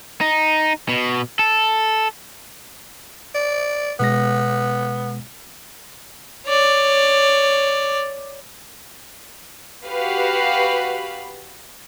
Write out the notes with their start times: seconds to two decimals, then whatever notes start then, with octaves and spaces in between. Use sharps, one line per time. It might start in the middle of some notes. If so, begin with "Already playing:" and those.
0.21 D#4
0.89 B2
1.39 A4
3.35 D5
4.00 B2 G#3 B3 A#6
6.46 C#5 D5
9.87 F#4 G4 B4 F5 B5